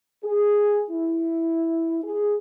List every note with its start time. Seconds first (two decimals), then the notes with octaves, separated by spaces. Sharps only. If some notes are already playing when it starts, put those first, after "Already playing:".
0.24 G#4
0.91 E4
2.04 G#4